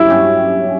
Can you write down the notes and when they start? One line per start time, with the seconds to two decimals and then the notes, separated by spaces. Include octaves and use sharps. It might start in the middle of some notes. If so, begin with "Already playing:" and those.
Already playing: G2 F#3 C#4 E4 G4
0.10 G2 F#3 C#4 G4